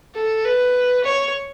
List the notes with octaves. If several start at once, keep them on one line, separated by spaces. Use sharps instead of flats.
A4
B4
C#5